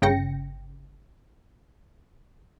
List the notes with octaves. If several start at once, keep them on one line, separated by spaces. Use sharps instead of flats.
G1 C#3 G5 A#6 C#7